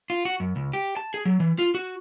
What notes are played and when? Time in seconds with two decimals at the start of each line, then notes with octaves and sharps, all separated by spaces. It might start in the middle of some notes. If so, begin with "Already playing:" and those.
0.10 F4
0.25 F#4
0.40 F#2
0.56 C#2
0.73 G4
0.97 A5
1.14 G#4
1.25 F#3
1.40 E3
1.59 F4
1.75 F#4